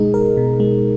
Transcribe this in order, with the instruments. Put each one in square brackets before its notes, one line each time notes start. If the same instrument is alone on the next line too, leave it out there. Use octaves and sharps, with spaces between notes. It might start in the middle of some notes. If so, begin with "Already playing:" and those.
Already playing: [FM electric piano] B2 G#3 D#4 [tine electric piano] G#4
[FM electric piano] A#4
B2
G#3